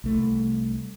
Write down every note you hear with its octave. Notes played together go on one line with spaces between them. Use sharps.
C2 A3